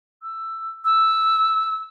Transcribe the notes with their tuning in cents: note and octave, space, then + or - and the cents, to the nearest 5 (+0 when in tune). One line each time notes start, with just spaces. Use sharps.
E6 +10
E6 -5